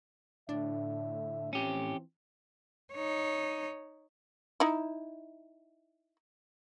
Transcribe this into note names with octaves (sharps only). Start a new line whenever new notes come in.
A2 D3 D4 E5
E3 F3 C4 C#4 G4
D#4 C#5
D#4 E4